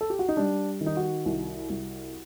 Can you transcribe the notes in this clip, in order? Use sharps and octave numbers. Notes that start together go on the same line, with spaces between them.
A4
G4
F#4
D#4
G3 D4
D#3
D#4
F#4
C2
C2